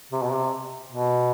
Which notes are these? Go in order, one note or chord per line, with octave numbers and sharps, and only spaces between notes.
C3
B2
C3
B2